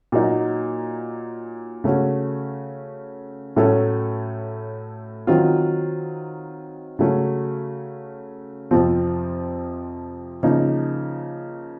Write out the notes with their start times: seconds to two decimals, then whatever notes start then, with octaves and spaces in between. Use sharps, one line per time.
0.12 A#2 F#3 A#3 D#4
1.84 C#3 A3 C#4 F#4
3.56 A2 F#3 A3 C#4 A4
5.27 D#3 F#3 C4 F4
6.99 C#3 F#3 A3 C#4
8.71 F2 C3 F3 C4 F4
10.43 C#3 F3 A#3 D#4